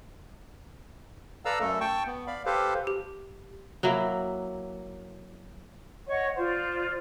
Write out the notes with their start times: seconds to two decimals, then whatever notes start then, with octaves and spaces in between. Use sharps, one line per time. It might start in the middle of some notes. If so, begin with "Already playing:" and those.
1.45 A4 B4 D5 F5 A#5 E6
1.60 F#2 A3 A4
1.81 G5 A5 C#6
2.06 B3
2.27 D5 F5 B5
2.46 G4 A4 B4 C5 F5
2.87 G4
3.83 F#3 A#3 E4
6.07 C#5 D#5 F#5 C#6
6.36 F4 C5 D5